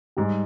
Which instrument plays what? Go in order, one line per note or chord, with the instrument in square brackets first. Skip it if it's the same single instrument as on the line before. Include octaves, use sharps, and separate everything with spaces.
[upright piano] G#2 [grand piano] G3